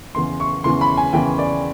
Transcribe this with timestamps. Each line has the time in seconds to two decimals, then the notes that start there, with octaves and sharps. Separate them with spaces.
0.15 E2 C#3 E3 C6
0.40 C#6
0.64 E2 C#3 E3 C6
0.81 B5
0.97 G#5
1.13 E2 C#3 E3 G5
1.38 D5